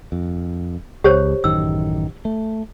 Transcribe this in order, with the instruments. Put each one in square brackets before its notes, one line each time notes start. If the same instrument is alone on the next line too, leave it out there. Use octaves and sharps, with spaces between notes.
[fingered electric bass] F2
[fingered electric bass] C#2 [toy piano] G4 C5 C#5
[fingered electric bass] A1 F#2 D#3 [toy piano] E6
[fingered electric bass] A3